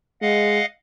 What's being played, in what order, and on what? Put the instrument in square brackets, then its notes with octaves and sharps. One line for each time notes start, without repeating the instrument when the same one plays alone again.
[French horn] G#3 [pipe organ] D#5 F5 F#5